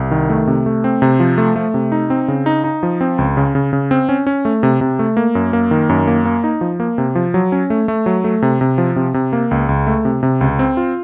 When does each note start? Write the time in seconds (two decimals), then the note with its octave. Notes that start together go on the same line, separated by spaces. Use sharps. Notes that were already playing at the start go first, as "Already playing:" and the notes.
Already playing: C2
0.11 D#3
0.30 A3
0.47 C3
0.66 A3
0.84 C4
1.02 C3
1.20 F3
1.38 A3
1.56 A3
1.74 C3
1.92 D#4
2.10 C4
2.28 C#3
2.46 D#4
2.64 D#4
2.83 F3
3.01 C4
3.18 C#2
3.37 C#3
3.55 C#3
3.73 C#3
3.91 C4
4.09 C#4
4.27 C#4
4.45 A3
4.63 C3
4.81 C3
4.99 A3
5.17 A#3
5.35 F#2
5.53 A#3
5.71 D#3
5.89 F#2
6.07 A#3
6.25 A#3
6.44 D#4
6.61 F3
6.80 A#3
6.98 C3
7.15 F3
7.34 F#3
7.52 C#4
7.70 A3
7.88 A3
8.06 F#3
8.24 A3
8.42 C3
8.61 C3
8.78 F3
8.96 C3
9.14 C3
9.33 A#3
9.51 C#2
9.69 C#2
9.87 A3
10.05 C3
10.23 C3
10.41 C#2
10.59 C4
10.77 F4